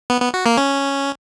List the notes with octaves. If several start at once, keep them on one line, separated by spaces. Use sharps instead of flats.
B3
B3
F#4
A#3
C#4